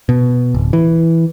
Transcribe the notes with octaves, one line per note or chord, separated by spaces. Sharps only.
B2
D1
E3